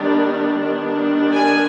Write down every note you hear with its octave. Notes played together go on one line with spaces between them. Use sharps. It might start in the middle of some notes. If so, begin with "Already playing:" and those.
Already playing: D#3 G3 B3 D4
D#3 G3 B3 D4
G#5